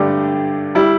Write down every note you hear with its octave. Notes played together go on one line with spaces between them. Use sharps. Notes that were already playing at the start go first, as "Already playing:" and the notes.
Already playing: G2 D3 A3 D4 G4
G3 E4